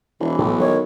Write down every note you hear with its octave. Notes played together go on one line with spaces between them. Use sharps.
E1 E3
B1 A2
D#3 C#5